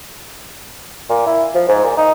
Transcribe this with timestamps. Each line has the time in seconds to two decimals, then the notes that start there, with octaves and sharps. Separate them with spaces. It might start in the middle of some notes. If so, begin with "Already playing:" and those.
1.10 A#2
1.27 E4
1.55 F3
1.69 G#2
1.84 A#2
1.98 D#4